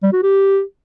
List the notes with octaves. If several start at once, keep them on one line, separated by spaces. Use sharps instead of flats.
G3
F#4
G4